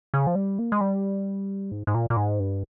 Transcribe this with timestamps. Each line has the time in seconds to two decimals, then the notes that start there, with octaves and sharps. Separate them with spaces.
0.14 C#3
0.27 F3
0.35 G3
0.59 A#3
0.72 G#3
0.81 G3
1.71 G#2
1.87 G#2
1.95 A#2
2.10 A#2
2.17 G#2
2.40 G2